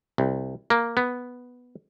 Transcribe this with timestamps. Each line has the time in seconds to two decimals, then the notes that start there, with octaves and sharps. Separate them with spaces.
0.18 C2
0.70 A#3
0.97 B3